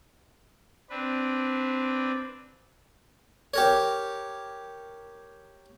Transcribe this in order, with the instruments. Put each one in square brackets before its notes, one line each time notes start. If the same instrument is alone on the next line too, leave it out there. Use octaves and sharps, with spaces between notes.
[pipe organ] C4 D4 B4
[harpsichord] G4 A#4 C#5